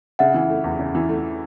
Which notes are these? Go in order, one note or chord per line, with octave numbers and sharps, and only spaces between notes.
C#3 E5 F#5
E3
A3
E2
C#3
E3
A3